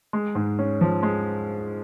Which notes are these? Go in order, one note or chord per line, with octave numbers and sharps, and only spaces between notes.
G#3
G#2
C#4
F3
G#3